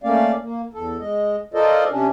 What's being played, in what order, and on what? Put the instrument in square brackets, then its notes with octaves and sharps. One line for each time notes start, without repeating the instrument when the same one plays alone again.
[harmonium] A3 A#3 C#4 D5 F5
A#3
E2 A4
G#3 D#5
F4 A4 A#4 C5 D5 D#5
C3 C#4 D4